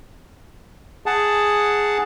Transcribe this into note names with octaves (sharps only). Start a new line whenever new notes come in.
G#4 F#5 A5